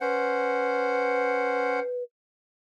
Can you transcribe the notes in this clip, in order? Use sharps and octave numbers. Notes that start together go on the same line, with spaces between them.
C#4 B4 C5 F#5